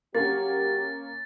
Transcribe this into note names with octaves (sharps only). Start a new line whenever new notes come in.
F#3 A#3 C#4 F#4 G4 A6